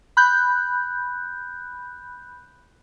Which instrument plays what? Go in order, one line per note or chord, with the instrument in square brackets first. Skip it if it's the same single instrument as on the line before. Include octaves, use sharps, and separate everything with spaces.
[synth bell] B5 F#6 G6